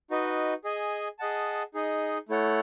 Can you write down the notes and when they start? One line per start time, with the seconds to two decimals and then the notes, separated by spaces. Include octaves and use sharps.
0.10 D#4 F#4 B4 D#5
0.64 G#4 D#5 G#5
1.19 G#4 D#5 F#5 A5
1.74 D#4 G#4 D#5
2.29 A3 E4 A4 C#5 F#5